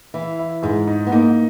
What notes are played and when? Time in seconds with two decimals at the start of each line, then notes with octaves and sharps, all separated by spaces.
0.14 E3 E4
0.39 E4
0.63 G#2 G#3
0.87 D#4
1.06 B3
1.12 A#3 D#4